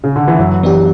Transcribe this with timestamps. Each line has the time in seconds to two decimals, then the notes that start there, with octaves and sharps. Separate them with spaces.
0.04 C#3
0.16 D3
0.27 E3
0.39 F#2 F#3
0.63 E3 B3 D4 G4